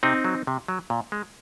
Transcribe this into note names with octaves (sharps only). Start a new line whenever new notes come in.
C3 C4 D#4
F#3
C3
F#3
A#2
G#3